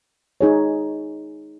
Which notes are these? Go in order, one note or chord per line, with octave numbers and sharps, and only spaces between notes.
D#4 G#4 C#5